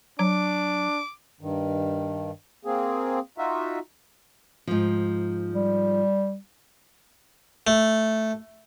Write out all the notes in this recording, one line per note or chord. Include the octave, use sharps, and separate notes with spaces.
F#3 D4 D6
G2 D#3
A#3 C4 G#4
D#4 F4 F#4 E5
G#2 F3
G3
A3